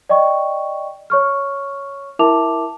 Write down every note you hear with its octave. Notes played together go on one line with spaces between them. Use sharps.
D5 D#5 G5 C#6
C#5 C#6 F6
E4 A#4 E5 A5 D6 F7